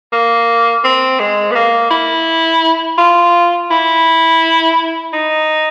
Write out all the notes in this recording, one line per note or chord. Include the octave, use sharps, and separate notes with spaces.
A#3
C4
G#3
B3
A#3
E4
F4
E4
D#4